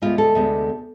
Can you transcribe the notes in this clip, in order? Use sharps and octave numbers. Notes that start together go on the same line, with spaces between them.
D2 C3 G#3 B3 F4
A4
D2 C3 G#3 B3